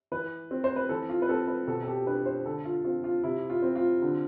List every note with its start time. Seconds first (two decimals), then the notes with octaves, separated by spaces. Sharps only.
0.12 E3 B4
0.51 C4
0.64 C5
0.76 B4
0.89 E3 A4
1.09 F4
1.22 B4
1.29 C4 A4
1.48 B4
1.67 B2 A4
1.83 A4
1.88 G4
2.06 D4 B4
2.26 C5
2.45 D3 A4
2.65 F4
2.84 C4 F4
3.04 F4
3.23 C3 E4
3.50 F4
3.62 C4
3.76 F4
4.02 D3